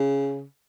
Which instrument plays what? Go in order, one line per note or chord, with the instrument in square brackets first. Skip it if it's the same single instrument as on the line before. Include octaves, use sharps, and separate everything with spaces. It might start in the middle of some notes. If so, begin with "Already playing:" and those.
Already playing: [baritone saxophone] C#3